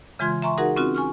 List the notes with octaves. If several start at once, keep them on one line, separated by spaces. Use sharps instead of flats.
C#3 E3 G#3 F4 C6 G#6
E5 G#5 A#5 C6 C#6
D#4 F#4 G#4 A#4 F#5
C4 C#4 D#4 F4 F#4
G#5 C#6 F6